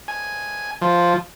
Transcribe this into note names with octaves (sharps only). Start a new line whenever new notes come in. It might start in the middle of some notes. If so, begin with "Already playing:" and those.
G#5
F3